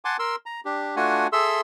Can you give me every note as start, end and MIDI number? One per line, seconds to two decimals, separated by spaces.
0.05 0.17 78
0.05 0.17 80
0.05 0.17 81
0.05 0.17 84
0.05 0.17 86
0.19 0.36 70
0.19 0.36 84
0.19 0.36 88
0.46 0.61 82
0.65 0.96 62
0.65 0.96 67
0.96 1.27 57
0.96 1.27 62
0.96 1.27 65
0.96 1.27 66
0.96 1.27 78
0.96 1.27 80
1.33 1.61 68
1.33 1.61 69
1.33 1.61 76
1.33 1.61 84
1.33 1.61 88